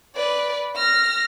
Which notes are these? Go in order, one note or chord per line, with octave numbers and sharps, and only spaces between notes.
B4 D5
F6 A#6